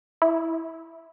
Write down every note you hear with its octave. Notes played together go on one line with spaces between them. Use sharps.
E4